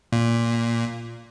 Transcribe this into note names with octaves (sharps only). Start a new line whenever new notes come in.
A#2